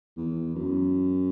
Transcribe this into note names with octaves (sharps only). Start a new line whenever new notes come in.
E2
F#2